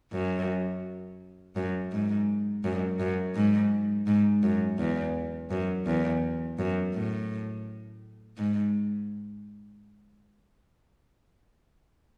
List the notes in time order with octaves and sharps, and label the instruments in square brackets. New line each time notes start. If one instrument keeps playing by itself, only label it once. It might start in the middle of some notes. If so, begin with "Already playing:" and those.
[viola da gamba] F#2
F#2
G#2
F#2
F#2
G#2
G#2
F#2
E2
F#2
E2
F#2
A2
G#2